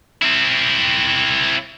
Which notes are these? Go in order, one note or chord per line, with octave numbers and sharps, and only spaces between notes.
C4 E4